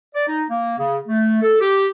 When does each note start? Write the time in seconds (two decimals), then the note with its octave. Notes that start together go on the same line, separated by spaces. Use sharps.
0.15 D5
0.28 D#4
0.50 A#3
0.78 C#3
1.07 A3
1.42 A4
1.61 G4